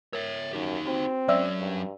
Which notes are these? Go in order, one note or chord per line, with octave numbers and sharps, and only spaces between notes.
A#4 C#5 E5
F#2 D#4 G4
C4 F#4
F#3 C#4 D5 E5 E6
G2